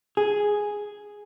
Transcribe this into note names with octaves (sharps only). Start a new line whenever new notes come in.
G#4